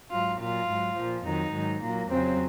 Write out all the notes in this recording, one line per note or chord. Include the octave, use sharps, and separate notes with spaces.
G#2 F#3 F4
A#2 F#3 F4
G#2 F#3
A#2 F3
F2 D#3 F#3 D#4
G#2 D#3 F#3
A#2 F#3 A#3
F2 C#3 F#3 C4